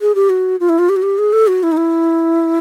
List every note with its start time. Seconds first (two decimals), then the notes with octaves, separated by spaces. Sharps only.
0.01 G#4
0.15 G4
0.30 F#4
0.60 F4
0.69 E4
0.79 F4
0.89 G4
0.96 F#4
1.03 G4
1.18 G#4
1.33 A4
1.47 F#4
1.63 E4
1.72 D#4
1.77 E4